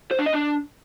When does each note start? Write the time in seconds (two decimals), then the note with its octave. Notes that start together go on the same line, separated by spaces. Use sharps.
0.11 C5
0.19 D4
0.26 D#5
0.34 D4